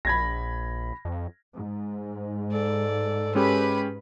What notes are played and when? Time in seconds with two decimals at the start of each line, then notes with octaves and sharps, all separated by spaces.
0.05 A#1 B5 G#6 A#6
1.05 F2
1.55 G#2
2.53 A4 D5
3.35 G#3 C#4 G4 B4 B5